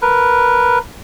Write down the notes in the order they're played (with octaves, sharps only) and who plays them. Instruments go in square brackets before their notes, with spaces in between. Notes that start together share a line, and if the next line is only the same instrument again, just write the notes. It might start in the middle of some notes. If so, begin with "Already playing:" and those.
[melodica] A#4 B4